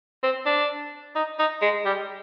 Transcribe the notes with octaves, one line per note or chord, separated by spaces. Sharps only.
C4
D4
D#4
D#4
G#3
G3